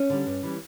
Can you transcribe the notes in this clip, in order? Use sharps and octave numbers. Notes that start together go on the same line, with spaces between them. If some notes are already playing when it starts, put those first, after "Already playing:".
Already playing: C#4
D3 G3
G2
E3 G3